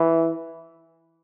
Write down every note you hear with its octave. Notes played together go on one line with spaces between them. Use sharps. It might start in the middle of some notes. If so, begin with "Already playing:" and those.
Already playing: E3